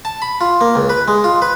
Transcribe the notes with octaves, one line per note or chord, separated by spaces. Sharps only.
A5
B5
F4
A#3
C#2
B4
G#3
F4
B4